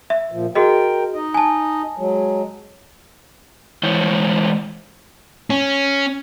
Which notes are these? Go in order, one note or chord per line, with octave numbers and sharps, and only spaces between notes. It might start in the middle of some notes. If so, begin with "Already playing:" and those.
E5
A#2 F3
F#4 G#4 A#4 D#5 G5
D#4 D#5
G#5 A5
F#3 G#3
E3 G#3 C5 C#5
C#4